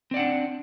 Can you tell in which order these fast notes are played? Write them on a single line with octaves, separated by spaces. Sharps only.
C4 D5 F#5 D4